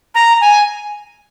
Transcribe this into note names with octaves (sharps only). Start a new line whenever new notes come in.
A#5
G#5